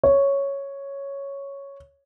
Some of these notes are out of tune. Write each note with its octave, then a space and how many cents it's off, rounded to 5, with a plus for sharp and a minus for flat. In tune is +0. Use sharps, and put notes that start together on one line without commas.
C#5 +0